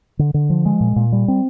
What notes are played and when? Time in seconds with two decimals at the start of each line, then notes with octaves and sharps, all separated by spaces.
0.19 D3
0.34 D3
0.50 F3
0.65 G#3
0.80 A#2
0.96 A#2
1.12 G3
1.28 C4